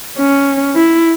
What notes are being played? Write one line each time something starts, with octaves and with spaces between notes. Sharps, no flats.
C#4
E4